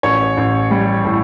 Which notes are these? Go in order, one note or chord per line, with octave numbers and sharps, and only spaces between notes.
A1 C#5
A1
G3
A2